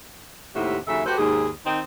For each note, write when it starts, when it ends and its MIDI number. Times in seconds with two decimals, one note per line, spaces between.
0.55 0.77 39
0.55 0.77 45
0.55 0.77 48
0.55 0.77 66
0.55 0.77 67
0.55 0.77 76
0.88 1.02 39
0.88 1.02 49
0.88 1.02 54
0.88 1.02 69
0.88 1.02 76
1.06 1.17 57
1.06 1.17 66
1.06 1.17 67
1.06 1.17 71
1.06 1.17 72
1.18 1.48 39
1.18 1.48 44
1.18 1.48 68
1.66 1.80 51
1.66 1.80 60
1.66 1.80 63